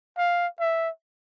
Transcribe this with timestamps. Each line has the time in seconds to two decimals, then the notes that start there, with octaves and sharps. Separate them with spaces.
0.17 F5
0.60 E5